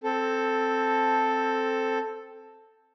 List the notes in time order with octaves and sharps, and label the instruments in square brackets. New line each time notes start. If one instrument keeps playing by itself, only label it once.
[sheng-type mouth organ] C4 A4